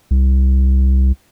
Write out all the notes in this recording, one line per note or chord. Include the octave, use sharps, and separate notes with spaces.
C2